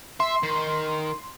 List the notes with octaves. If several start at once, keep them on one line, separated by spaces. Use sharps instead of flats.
E5 C6
D#3